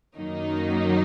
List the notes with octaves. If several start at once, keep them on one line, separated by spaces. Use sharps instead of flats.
F#2 D#3 F#3 A#3 D#4